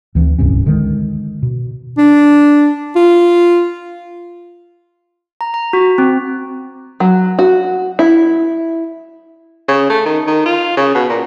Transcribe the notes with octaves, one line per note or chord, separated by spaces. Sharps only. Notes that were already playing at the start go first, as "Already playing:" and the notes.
D2 E3 C4
D1 C2 G2 C#4
D3 D#3 G#3
B2
D4
F4
A#5
A#5
F#4
C4
F#3
F#4
E4
C#3
A3
D#3
D#3
F4
C#3
B2
A#2